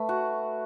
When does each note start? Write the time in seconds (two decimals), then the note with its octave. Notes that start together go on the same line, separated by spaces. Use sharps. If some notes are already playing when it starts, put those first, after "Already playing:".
Already playing: A3 B4
0.09 F#4